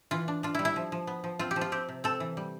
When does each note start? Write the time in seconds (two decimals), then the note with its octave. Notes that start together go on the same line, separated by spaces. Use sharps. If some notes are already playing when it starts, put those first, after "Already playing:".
0.11 E3 F4
0.28 D4
0.43 D4 F4
0.55 G3 E4
0.65 E4
0.76 F3
0.92 F3
1.07 B3
1.24 F3
1.39 C4 F4
1.51 G4
1.56 F3
1.61 F4
1.72 C4 G4
1.89 C3
2.04 C4 A4
2.20 E3
2.37 G3